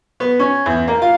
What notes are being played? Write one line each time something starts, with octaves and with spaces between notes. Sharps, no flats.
B3
C#4
E2
A#3
F4